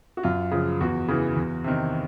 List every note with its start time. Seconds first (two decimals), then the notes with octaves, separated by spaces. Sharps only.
0.17 F#4
0.23 F#2 F4
0.51 C#3 F3
0.81 E2 F#4
1.08 C#3 E3
1.36 E2
1.64 C3 D#3